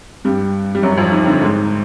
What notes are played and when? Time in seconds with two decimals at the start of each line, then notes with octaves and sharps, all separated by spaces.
0.25 G2 G3
0.75 G3
0.83 F#2 F#3
0.98 F2 F3
1.12 D#2 D#3
1.27 D3
1.41 G#2 G#3